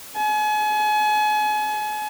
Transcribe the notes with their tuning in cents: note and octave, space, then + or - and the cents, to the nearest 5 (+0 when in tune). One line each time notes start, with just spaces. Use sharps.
G#5 +35